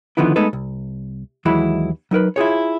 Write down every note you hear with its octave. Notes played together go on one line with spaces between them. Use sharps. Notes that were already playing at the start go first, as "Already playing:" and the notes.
D3 D#3 F3 B3 E4
G#3 A3 B3 D#4 A4 B4
C2
D#2 E3 F#3 G#3 E4 B5
F#3 D#4 A#4 B4
E4 F4 G#4 C#5